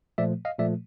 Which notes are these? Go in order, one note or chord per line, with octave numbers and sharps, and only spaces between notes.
A#2 F3 A3 D5 E5
D#5 F5
A#2 F3 A3 D5 E5